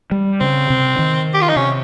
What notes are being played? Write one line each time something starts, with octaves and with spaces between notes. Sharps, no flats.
G3
C#3 C4
C3
D#3
G4
F4
D#4
C3 C#4